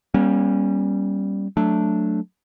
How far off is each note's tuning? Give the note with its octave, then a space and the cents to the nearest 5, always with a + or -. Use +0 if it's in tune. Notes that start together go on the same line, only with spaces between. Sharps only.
G3 +0 A#3 +40 C#4 -25
F#3 -5 A3 +0 D4 +0